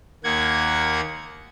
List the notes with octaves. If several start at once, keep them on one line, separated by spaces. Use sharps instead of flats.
D#2 A#3 F#5 G#6